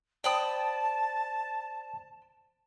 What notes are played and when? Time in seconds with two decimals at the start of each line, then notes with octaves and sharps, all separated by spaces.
0.24 C5 D5 G5 A5 B5 D#6